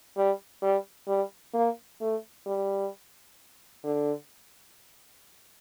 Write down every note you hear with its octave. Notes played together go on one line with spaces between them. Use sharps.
G3
G3
G3
A#3
A3
G3
D3